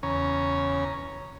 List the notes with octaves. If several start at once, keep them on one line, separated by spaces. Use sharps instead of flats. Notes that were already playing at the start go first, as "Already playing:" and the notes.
E2 C#3 C#4 C#5 A#5